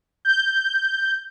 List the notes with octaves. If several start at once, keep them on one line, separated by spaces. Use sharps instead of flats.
G6